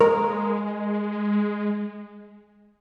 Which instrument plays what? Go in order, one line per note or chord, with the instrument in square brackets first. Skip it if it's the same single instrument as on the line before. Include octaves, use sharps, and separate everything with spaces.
[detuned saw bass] G#3 [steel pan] A#4